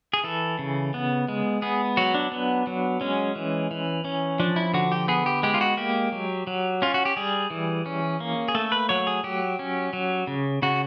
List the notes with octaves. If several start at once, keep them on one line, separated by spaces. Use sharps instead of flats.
G#4
E3 A4
C#3
B3
G#3
B3 G#4
F#3 F#4
D4
B3
F#3
G#3 C#4
E3
E3
C#4
F3 D4
E4
D3 F#4
G4
B3 G#4
G4
G#3 G4
F4
F#4
A#3 G4
F#3
F#3
C#4 F4
F#4
G4
G3 G#4
E3
C#4
A#3
G#4
A3 A4
B4
F#3 C#5
G#4
F#3 G4
C#4
F#3
C#3
C#3 F#4